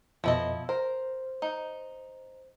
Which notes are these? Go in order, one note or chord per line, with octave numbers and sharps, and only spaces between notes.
F2 B2 F3 E4 D#5
A#4 C5
D#4